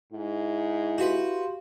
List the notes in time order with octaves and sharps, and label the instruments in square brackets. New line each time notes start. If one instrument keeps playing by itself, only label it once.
[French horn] G#2 [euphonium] E4
[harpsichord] F#4 B4 [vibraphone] G4 F5 C6